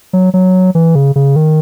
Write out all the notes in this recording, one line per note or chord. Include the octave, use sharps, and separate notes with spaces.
F#3
F#3
E3
C#3
C#3
D#3